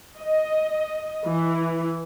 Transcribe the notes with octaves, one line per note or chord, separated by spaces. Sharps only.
D#5
E3